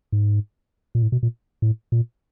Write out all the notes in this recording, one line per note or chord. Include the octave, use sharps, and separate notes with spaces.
G#2
A#2
A2
B2
A#2
A2
A#2